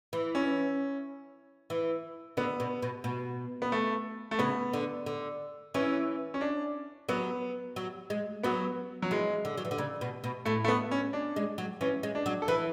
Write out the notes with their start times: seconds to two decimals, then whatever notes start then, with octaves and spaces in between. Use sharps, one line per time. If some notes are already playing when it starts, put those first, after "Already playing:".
0.13 E3
0.35 C#4
1.70 E3
2.37 D3 B3
2.60 B2
2.82 B2
3.04 B2
3.62 B3
3.72 A3
4.31 A3
4.39 C#3 B3
4.73 D3
5.06 D3
5.74 E3 C#4
6.34 C#4
6.41 D4
7.09 F#3 B3
7.76 F#3
8.10 G#3
8.43 F#3 B3
9.02 F#3
9.11 E3 G#3
9.45 D3
9.58 F#3
9.65 E3
9.71 D3
9.78 C#3
10.01 B2
10.24 B2
10.45 A2 A3
10.64 A3
10.68 B3
10.91 C#4
11.13 D4
11.36 G#3
11.58 F#3
11.81 E3 C#4
12.03 G#3
12.15 D4
12.26 F#3
12.42 A4
12.48 E3 B4